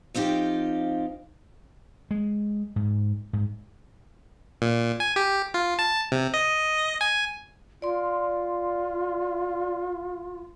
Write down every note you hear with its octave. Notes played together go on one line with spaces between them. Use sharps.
F3 C4 D#4 F4 G4
G#3
G#2
G#2
A#2
G#5
G4
F4
A5
C3
D#5
G#5
F4 D5 C6